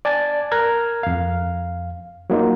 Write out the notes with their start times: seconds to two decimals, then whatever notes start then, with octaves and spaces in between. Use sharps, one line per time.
0.05 D5 G#5 A5 A6
0.52 A#4 A#5 F6 F#6 G#6
1.03 F2 F5
2.30 F#3 A#3 D#4 F4